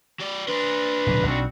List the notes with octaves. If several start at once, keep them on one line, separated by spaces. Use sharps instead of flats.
F#3 D5
D4 B4 C5
D1 B2 F#3
B1 G3 C4 F#4